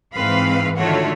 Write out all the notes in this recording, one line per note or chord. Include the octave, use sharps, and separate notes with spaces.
G#2 E3 C4 B4 F5
D3 D#3 A3 F4 F#4 C#5